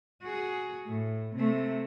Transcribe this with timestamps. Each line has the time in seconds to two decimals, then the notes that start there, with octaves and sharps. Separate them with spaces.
0.22 F#4 G#4
0.86 A2
1.35 C3 A3